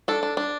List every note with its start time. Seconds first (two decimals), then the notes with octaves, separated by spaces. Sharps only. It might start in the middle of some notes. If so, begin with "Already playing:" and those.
0.08 D4 A4
0.23 D4
0.37 D4